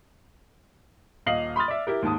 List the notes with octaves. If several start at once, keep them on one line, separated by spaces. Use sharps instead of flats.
D#1 D#5 F5 C7 F#7
B5 C6 D#6 F6 A6
D5 E5
E4 G4 A#4
D#2 G#2 A5 D#6